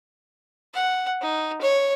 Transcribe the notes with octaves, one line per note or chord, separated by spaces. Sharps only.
F#5
D#4
C#5